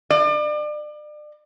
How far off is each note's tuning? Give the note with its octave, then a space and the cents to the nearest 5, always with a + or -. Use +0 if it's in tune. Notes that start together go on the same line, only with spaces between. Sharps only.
D5 +35